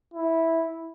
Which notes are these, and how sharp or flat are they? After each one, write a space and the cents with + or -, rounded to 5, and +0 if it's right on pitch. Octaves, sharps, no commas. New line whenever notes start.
E4 -10